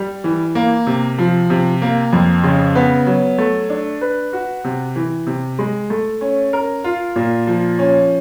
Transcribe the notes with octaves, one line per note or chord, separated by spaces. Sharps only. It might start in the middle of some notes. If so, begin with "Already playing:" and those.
Already playing: G3
E3
A#3
C3
F3
C3
A#3
F2
C#3
B3
F#3
A3
D4
B4
F#4
C3
E3
C3
G#3
A3
C#4
A#4
F4
A#2
F3
C#4